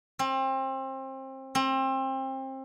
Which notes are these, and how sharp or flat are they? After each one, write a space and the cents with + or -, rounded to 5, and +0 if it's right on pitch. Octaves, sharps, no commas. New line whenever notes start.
C4 +30
C4 +30